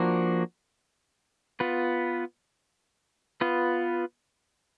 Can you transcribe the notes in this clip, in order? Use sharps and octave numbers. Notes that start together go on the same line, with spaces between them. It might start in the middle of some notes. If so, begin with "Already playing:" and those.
Already playing: F3 A#3 D4 F#4
B3 F4 B4
B3 F4 B4